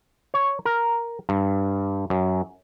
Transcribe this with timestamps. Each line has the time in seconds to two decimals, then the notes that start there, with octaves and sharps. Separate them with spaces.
0.34 C#5
0.65 A#4
1.29 G2
2.10 F#2